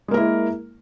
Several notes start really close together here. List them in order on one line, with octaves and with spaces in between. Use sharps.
G#3 A#3 A#4 E4